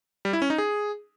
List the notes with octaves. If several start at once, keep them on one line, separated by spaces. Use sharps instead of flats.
G3
E4
C#4
D#4
G#4